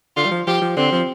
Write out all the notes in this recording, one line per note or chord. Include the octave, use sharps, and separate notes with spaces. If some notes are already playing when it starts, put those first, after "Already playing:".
D3 F4
G3
F3
F3 G4
F3
D3 C4
F3